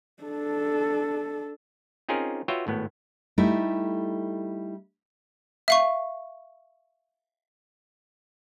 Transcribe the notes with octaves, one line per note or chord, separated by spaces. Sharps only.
D4 A4
C4 C#4 D#4 F4 G#4 A#4
F4 F#4 B4 C#5 E5 G5
G#1 A2 B3
G3 A3 D#4 E4
E5 F5 C#6